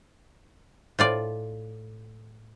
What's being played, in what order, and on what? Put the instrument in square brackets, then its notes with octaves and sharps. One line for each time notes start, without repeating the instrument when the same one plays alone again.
[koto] A2 F4 D5